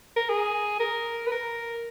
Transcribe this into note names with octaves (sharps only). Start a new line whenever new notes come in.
A#4
G#4
A#4
B4
A#4